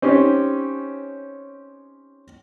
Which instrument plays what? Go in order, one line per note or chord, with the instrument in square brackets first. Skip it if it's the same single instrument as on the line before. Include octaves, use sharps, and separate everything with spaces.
[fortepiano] C4 C#4 D#4 G4